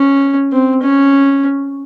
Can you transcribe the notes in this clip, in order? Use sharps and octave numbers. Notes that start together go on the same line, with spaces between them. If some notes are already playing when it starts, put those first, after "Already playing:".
Already playing: C#4
C4
C#4